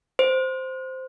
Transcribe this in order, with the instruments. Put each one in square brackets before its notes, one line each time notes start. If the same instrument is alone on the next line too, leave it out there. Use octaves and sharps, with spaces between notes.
[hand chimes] C5